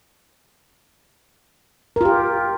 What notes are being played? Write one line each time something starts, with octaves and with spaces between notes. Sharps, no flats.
F4 G4 A#4